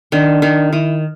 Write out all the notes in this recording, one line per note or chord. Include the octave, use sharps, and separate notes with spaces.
D#3 D4
D#3
D#3 E4